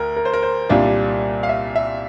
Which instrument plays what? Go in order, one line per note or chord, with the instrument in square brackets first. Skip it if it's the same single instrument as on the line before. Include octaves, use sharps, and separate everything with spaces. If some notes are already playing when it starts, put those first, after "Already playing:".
Already playing: [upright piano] D2 [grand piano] A#4
[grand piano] A#4
C5
A#4
C5
[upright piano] C2 A#2 G3 D4 F4 [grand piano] D5
[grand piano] F5
E5
E5